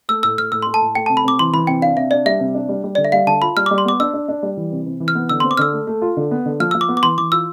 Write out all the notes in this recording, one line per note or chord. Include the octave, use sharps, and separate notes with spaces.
A3 E6
A2 E6
A2 F6
A2 E6
C6
A3
A5
A2
A3 G5
A5
C3
B5
C3 D6
E3 C6
E3 B5
C3 G5
D4 F5
C3 E5
D4 D5
G3 E5
C3
D4
G3
G3
D3 D5
E5
G3 F5
D3 A5
F4 B5
G3 F6
D6
G3
C6
B3 D6
D4 E6
D4
D4
G3
E3
C3
C3
E3
F6
B3
D3 E6
C6
C4
D6
D3 E6 F6
A3
A3
F4
D3
B3
D3
F3 F6
E6
F3
D6
B3
D6
E3 C6
E3 D6
F4 E6